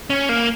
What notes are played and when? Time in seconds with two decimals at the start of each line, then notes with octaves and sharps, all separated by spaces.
0.10 C#4
0.29 A#3